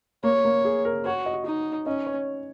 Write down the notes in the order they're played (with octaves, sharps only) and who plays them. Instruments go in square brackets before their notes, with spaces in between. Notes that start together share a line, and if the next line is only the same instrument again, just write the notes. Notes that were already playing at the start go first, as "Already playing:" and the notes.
[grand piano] A#3 [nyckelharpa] C#5
[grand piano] A#3
G#4
A#4
[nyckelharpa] F#4 [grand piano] C#5
[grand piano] D#5
[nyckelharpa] D#4
[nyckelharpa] C#4 [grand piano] D#5
[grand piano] C#5